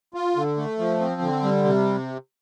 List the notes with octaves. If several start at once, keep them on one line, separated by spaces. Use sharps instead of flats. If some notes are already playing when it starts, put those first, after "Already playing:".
F4
D3
A3
F3
C4
D3
G3
C3